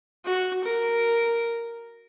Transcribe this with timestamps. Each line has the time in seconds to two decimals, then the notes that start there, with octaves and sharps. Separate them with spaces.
0.25 F#4
0.64 A#4